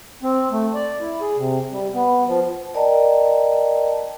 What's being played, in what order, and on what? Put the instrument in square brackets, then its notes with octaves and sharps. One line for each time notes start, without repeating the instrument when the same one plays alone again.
[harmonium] C4
A3
D5
E4
G#4
C3
G3
B3
F3
[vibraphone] A#4 D5 D#5 G5 A5 A#5